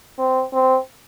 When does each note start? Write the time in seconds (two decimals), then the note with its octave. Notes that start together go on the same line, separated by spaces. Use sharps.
0.19 C4
0.53 C4